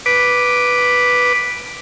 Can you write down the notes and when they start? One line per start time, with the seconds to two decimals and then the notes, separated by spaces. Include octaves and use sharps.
0.06 B4 D6